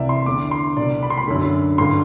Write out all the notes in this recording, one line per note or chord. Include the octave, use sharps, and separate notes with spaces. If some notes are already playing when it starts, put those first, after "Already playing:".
Already playing: C2 C3 E3 D5 E5
C6
E2 D3 D6
C6
C2 B2 D5
B5
C6
B5
F#2 D3
G2 D3 C6